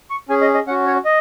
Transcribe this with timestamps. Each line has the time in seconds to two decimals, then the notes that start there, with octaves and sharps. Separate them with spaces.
0.10 C#6
0.29 C#4 G#4 G#5
0.41 D#5
0.54 D#5
0.67 C#4 F#5
0.71 F#4
0.87 C#5
1.05 D#5